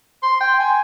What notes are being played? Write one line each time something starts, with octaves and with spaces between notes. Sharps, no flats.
C6
G5
G#5